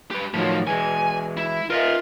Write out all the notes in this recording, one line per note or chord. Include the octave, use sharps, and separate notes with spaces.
G4 B4
A2 D#3 F3 F#3
E3 G#3 G#5
E4
F4 A#4 D#5 E5